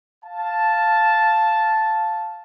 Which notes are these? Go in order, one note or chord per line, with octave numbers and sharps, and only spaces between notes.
F5 A5